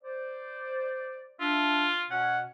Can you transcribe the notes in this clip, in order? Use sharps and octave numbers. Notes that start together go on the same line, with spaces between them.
C5 D5
D4 F4 E5
B2 C#4 F#5